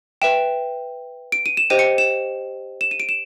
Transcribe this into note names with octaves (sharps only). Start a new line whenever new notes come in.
B4 E5 G5 E7
D7
D#7
E7
G4 C5 D#5 G5 D#7
C#7
E7
E7
D#7
D7
E7